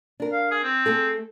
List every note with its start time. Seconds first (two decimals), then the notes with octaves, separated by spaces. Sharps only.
0.20 D4 A#4
0.32 F5
0.51 G#4
0.63 C4
0.86 A3 G#4 A4